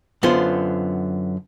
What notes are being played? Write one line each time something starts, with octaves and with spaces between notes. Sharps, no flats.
F#2 D3 B3 F4 C5